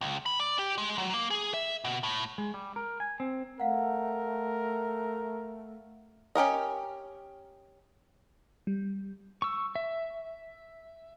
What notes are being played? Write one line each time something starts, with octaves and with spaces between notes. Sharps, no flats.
C#2
B5
D5
G4
G#3
F#3
A#3
G#4
E5
B2
A2
G#3
G3
A#4
G#5
C4
A3 A#4 F5 F#5
C#4 G4 A#4 D#5
G3
C#6 E6
E5